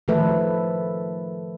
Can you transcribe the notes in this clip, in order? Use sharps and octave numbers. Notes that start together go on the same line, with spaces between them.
D#3 F3 A3 A4 B4 E5